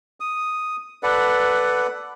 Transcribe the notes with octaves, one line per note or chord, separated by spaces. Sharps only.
D#6
A4 B4 D5 F#5